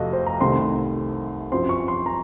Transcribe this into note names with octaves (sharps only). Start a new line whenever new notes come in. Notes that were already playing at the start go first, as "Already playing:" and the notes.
Already playing: F2 C3 A3 F#4 A4 D#5 F5
C5
A#5
C2 C3 D#3 A3 C4 C6
F#2 F3 C4 C6
C#6
C6
A#5